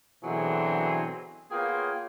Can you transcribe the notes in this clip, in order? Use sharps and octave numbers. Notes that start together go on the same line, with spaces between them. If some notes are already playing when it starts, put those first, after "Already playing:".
B2 D3 E3 F#3 C4 G#4
A#3 B3 F4 G#4 C#5 G5